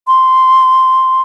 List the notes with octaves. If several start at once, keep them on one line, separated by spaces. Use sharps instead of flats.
C6